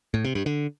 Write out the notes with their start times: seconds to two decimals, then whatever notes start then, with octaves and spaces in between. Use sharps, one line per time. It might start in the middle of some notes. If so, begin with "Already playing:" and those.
0.14 A2
0.25 C3
0.35 G2
0.46 D3